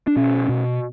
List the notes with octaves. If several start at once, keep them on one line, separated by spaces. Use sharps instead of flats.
D4
B2 C#4
B2